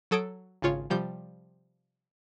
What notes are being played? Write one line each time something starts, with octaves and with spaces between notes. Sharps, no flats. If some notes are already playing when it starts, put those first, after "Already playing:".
F#3 A4 D#6 G#6 D7
G#1 C#3 F4 C#5
C3 F3 G3 G6